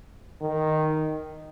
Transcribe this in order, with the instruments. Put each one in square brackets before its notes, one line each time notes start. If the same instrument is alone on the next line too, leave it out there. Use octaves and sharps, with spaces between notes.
[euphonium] D#3